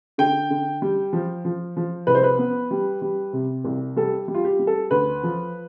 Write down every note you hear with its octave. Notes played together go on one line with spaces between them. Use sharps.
D3 G5
D3
G3
F3
F3
F3
C2 B4
C5
B4
B3
G3
G3
C3
C2
G3 A4
G3
F4
G4
G3
A4
D2 B4
F3